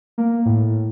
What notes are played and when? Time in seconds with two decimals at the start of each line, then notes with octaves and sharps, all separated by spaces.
0.18 A#3
0.46 A2